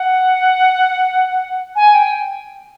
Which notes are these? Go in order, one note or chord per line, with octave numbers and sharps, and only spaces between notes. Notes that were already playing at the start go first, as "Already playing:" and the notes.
Already playing: F#5
G#5
G5